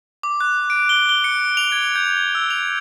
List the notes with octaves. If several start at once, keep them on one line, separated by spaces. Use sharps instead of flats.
D6
F#6
D7
G7
G7
C#7
F7
G#6
G6
E6
F7